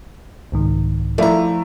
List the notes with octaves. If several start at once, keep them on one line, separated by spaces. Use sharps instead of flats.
C2 G#2 D#3
F3 A3 E4 F4 D5 E5 A#5